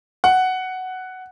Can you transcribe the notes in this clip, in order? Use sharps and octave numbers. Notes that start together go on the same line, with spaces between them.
F#5